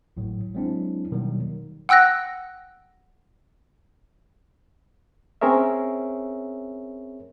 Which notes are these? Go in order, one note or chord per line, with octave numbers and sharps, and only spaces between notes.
G#1 A2 F#3
F#3 G#3 C4 D4 E4
B2 D#3 F#3 G3 A#3
F#5 G5 E6 F#6 A#6
C4 C#4 G#4 A#4 C#5 E5